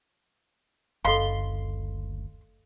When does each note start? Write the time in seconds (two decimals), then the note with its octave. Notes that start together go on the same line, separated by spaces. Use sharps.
1.05 F#1 D2 A4 D#5 F5 C6